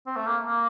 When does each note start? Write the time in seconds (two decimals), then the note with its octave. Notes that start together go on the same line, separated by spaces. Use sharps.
0.06 C4
0.16 A3
0.26 A#3
0.46 A#3